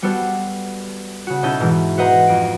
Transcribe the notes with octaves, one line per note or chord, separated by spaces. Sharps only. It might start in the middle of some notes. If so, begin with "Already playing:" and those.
G3 B3 F#4 A4 C5
C#3 F#4
B2 C#4 D#4 E4 A4 G6
G#2 B2 E3
F#4 B4 C5 D#5 F#5 A#5
F2 D7